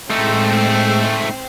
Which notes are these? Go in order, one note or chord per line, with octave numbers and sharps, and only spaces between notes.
A2 G#3 A3 C4 D#4 C5 E6